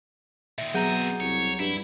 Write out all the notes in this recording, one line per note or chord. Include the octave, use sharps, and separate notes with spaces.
A#2 D#3 E5
B2 F#3 C4 G#4 D#5 F#5 A#5 G6
C2 C#5
G2 E4